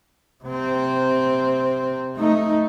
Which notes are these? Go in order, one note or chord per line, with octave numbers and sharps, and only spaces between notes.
C3 C4
A3 D#4